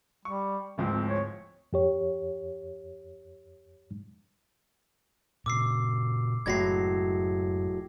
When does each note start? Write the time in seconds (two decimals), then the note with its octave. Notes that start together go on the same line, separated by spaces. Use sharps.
0.25 G3 C#6
0.78 D1 G#2 F3 C4
1.08 C#5
1.73 F2 G4 C#5
5.46 A#2 C#3 D6 E6 C7
6.46 F#1 A2 F#3 G#3 G#6 A#6 C7